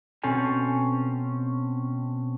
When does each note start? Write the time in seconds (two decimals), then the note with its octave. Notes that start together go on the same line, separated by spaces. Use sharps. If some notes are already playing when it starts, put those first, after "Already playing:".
0.24 B2 C4 C#4 A4 G#5